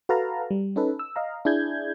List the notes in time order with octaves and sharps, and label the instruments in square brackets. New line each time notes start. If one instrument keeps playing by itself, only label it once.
[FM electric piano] F#4 A4 B4 F5 A5 A#5
G3
C#4 D#4 A4 B4
E6
D#5 F5 A#5
D4 E4 G#4 G6 G#6